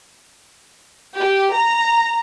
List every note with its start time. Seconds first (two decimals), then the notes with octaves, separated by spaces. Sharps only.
1.18 G4
1.53 A#5